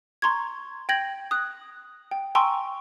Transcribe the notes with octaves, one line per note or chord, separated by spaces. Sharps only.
A#5 C6 C#6 G#6
G5 G6 G#6 A#6 F#7
D#6 F#6
G5
G5 G#5 A#5 C6 C#6 E6